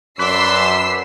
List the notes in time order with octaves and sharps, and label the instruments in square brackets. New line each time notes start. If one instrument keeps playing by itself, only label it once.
[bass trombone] F#2 [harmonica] D4 D5 C6 [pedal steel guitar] B4 [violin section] E6 C7